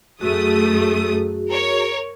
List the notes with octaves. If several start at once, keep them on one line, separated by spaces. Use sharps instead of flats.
F#2 A3 F#4 G#4 D#6
A#4 C#5